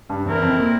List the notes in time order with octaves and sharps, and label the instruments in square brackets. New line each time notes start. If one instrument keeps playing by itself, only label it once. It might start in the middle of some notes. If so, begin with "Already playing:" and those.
[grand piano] G2
[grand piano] E2 [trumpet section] C4 E4 A#4
[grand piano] F2
A#2